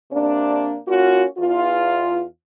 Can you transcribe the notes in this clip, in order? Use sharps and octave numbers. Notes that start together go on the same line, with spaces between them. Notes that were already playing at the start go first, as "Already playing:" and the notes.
C3 A#3 D4
A#3 C#4 F4 F#4
E2 F4